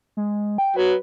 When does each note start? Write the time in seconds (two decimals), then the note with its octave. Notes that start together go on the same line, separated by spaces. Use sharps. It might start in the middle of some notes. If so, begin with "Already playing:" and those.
0.17 G#3
0.58 G5
0.76 F#3 B4